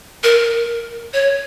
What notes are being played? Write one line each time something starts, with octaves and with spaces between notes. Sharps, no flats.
A#4
C#5